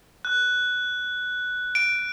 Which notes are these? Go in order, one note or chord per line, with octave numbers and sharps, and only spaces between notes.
F#6
D7